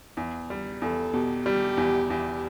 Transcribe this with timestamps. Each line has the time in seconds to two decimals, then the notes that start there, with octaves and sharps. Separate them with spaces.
0.17 E2
0.50 G3
0.82 E2 A4
1.13 B2 G4
1.46 G3 G4
1.77 E2
2.09 E2 G4